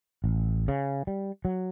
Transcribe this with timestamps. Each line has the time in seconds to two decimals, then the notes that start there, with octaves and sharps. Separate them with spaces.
0.24 A1
0.68 C#3
1.07 G3
1.45 F#3